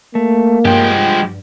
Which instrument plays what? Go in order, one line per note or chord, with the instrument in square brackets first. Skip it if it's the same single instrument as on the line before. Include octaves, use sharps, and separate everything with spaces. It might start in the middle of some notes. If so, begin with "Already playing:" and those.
[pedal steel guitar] A3 [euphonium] A#3
[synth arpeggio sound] G2 [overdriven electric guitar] F3 G4 [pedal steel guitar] G#3 G5